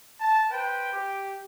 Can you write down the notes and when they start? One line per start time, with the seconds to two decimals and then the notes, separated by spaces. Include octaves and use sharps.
0.20 A5
0.50 B4 C5 G5
0.93 G4